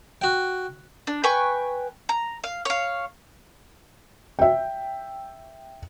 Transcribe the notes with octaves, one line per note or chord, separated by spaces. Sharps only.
F#4 G5
D4
B4 G5 G#5 C#6
A#5
F5
C#5 F5
E5 G5